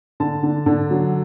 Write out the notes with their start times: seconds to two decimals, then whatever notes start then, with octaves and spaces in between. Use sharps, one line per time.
0.20 D3 A5
0.43 D3
0.66 D3
0.90 F#3